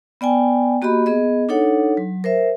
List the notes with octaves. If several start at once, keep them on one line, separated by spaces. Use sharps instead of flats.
B3 D5 G5 G#5
A#3 F#4 G4 D#5 B5
B3 G#4 D#5
D4 D#4 A4 C#5 F#5
F#3
A#4 C5 E5